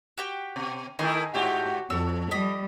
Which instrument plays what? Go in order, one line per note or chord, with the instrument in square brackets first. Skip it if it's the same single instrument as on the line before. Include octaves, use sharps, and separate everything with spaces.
[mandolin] F#4 G4 G5
[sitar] B2
[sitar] D#3 A3 E4 [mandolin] D#4 G#4 C6
[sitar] G#2 G4 E5 [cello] F#4
[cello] F2 [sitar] F3 A4 [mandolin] E6
[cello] G3 [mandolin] D#5 B5